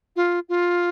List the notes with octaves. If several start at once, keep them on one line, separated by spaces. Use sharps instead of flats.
F4
F4